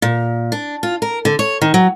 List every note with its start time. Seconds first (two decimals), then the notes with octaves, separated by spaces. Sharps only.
0.02 A#2
0.52 D4
0.83 F4
1.02 A#4
1.25 D3
1.39 C#5
1.62 D#3
1.74 F#3